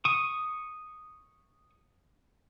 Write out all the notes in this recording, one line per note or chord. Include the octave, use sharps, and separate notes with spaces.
C#6 D#6